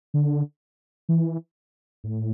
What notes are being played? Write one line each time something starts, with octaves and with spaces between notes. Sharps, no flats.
D3
E3
A2